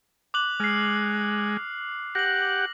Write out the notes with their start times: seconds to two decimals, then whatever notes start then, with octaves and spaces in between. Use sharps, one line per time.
0.34 D6 F#6 F#7
0.60 G#3 F6 C7
2.15 G4 F#5 A#6 F#7